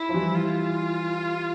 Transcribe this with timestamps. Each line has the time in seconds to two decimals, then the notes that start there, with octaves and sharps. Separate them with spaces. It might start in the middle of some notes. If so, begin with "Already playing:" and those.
Already playing: E4
0.09 F3
0.14 E3 G3
0.35 F4